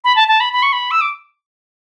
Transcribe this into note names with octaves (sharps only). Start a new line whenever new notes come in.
B5
A5
A5
B5
B5
C#6
B5
E6
D6